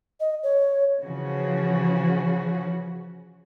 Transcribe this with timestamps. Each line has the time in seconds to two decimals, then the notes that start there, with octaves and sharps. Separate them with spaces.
0.20 D#5
0.43 C#5
1.03 C#3 E3 F3 F#4